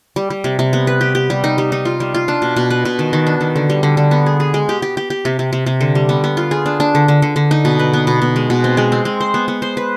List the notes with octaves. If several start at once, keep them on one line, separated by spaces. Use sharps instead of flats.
G3
G3
C3
C3
B3
B4
G4
G4
G3
D#4
G3
D#4
F4
G3
F4
D4
B2
B2
B4
B2
D#3
D#3
D4
D#3
D3
G3
D3
D3
B3
G#4
G#4
G#3
G4
G4
G4
G4
C3
C3
C3
C3
D3
G3
B3
B3
F4
G#4
D4
D4
D3
D3
D3
D3
D#4
B2
B4
B3
B2
B2
G#3
B2
C4
G#3
C4
G#3
C5
B3
B3
C5
B4